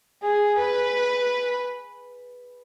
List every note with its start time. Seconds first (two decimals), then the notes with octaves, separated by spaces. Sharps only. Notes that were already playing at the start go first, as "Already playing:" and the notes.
0.23 G#4
0.60 B4